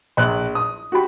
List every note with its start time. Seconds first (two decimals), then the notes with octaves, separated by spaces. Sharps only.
0.17 A#1 F#6
0.55 D#6
0.92 F#4 G4 B5